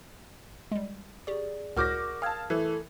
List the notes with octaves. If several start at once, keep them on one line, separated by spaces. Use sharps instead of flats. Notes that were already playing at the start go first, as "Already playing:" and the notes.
G3 G#3
G4 G#4 D5 C#6
C#2 A2 F#4 A#4 D6 F6 G6 A#6
F5 G5 A5 D#6 E6 G#6
E3 A3